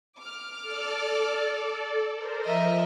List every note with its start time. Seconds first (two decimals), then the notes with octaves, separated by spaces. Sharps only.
0.19 D6 F6
0.62 A4 D5
2.14 A#4 C5
2.45 F3 A#4 D#5 E5